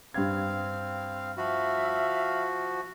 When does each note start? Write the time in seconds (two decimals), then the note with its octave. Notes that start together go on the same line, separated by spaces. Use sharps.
0.14 G2 C4 F5 G#6
1.37 F3 F#4 E5 F5 B5